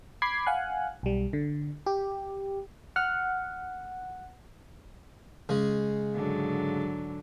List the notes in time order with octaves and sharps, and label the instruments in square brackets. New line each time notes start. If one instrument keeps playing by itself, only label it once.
[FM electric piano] B5 D6 G#6 B6 C7
F5 F#5 G#5 F#6
B1 G3
D3
G4
[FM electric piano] F#5 [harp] F6
[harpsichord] C#3 G#3
[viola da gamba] G#2 D3 F#3